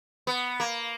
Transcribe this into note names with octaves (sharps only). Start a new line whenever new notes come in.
B3
A#3